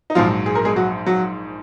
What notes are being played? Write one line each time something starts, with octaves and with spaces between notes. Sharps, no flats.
D#4
A#1 G#2 F3 F#3 F4
G#4
A#4
G#3 G#4
F#3 F#4
F#3 F#4